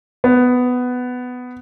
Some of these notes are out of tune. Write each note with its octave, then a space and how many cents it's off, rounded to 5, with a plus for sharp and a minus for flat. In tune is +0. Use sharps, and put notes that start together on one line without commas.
B3 +10